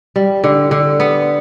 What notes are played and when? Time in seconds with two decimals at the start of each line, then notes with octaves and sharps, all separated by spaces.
0.16 G3
0.44 D3
0.71 D3
1.00 B3